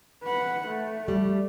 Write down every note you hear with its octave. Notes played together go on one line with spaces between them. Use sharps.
B4 F#5
A3
G3